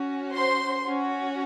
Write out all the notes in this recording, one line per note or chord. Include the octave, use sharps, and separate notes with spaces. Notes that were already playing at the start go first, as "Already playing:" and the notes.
Already playing: C#4 F#4
C5 C6
C#4 F#4